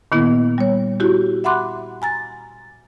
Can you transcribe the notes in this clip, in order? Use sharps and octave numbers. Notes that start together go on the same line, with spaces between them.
A#2 D#3 A#3 B3 E4
G3 C#5
E4 F#4 G4
E5 F#5 B5 C6 D6 F#6
G#5 A#5 A6